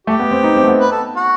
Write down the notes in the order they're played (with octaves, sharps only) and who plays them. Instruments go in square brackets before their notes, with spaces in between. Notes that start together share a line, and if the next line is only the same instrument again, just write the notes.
[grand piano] A3 [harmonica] G4
[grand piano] B3
C4
D#4
C4
A3
B3
[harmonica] B4
A4
F#4